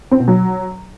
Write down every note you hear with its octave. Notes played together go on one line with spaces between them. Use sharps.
C4
B2
F#3